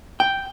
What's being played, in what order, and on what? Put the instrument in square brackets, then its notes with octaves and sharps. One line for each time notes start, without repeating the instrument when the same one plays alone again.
[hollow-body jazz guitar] G5